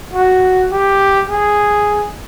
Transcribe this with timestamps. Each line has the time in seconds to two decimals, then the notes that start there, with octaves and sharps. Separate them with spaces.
0.13 F#4
0.71 G4
1.30 G#4